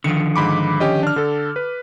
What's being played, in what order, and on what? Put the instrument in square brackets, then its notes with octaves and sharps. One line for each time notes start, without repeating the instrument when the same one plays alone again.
[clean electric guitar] D3 D#3 F3 [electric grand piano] C#7
[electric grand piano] G#2 B5 D6
C#4 G4 D#5
D4 F6
D3 A4
B4